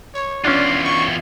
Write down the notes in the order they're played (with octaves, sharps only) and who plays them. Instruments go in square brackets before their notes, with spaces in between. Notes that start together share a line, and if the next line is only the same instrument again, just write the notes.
[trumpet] C#5
[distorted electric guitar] E2 F4 [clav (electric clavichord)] C#4 D4 [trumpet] D5
[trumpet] C#6